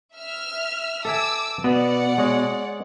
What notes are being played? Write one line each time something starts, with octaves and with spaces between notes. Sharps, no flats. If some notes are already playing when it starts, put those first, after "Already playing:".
E5 F6
A4 E5 G#5 D6 E6
B2 B3 D5 F#5
G#3 C#5 D#5